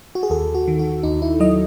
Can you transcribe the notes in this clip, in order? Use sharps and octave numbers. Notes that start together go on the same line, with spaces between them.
F#4
G#4
D#2 A4
F#4
D#3
F#4
D#2 D#4
E4
F#3 D#5